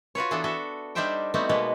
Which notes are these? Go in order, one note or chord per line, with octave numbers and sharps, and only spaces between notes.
F4 F#4 B4 C#5
E3 B3 D4 G#4 A4
F#4 A4 E5
G3 D4 D#4 C5 E5 G5
G3 A3 B3 C4 D#4 F#4
B2 G#3 A#3 B3 B4